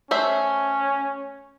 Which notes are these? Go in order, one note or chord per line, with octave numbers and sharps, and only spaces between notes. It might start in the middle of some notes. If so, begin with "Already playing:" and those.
A3 C#4 C5 E5